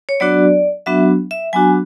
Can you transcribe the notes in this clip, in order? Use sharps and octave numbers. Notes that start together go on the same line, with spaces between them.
C#5
F#3 B3 D4 F#4 D5
F#3 B3 D4 F#4 E5
E5
F#3 B3 D4 F#4 G#5